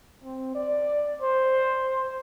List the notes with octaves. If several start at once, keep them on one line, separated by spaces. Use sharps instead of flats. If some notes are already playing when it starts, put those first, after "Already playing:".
C4
D5
C5